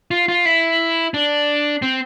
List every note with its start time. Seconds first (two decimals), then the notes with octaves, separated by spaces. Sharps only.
0.11 F4
0.28 F4
0.46 E4
1.14 D4
1.82 C4